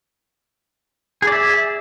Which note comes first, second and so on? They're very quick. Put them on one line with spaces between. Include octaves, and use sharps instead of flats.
G#4 D5 E5